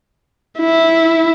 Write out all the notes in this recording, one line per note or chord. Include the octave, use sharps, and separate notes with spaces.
E4